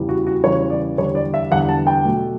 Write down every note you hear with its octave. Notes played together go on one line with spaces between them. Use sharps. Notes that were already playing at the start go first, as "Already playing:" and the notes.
Already playing: E2 C#3 E3 G3
F#4
F#4
E2 C#3 E3 G3 C#5
D5
E2 D3 G3 C#5
D5
E5
E2 D3 G3 F#5
A5
G5
B2 F#3 A3